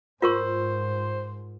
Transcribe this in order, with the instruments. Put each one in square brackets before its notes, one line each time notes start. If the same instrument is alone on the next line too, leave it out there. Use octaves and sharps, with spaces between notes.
[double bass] G#2 [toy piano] F4 A#4 C#6 [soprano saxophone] C5